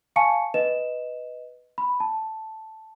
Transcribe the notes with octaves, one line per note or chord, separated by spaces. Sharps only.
F5 G#5 A5 C#6 C#7
B4 D#5 E7
B5
A5